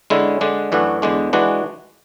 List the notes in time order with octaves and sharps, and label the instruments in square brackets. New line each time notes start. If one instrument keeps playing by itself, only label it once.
[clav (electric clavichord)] D3 G#3 C#4 E4
D3 G#3 D4
F#2 E3 A3 D4 F#4
E2 D3 G#3 D4
E3 G#3 D4 F#4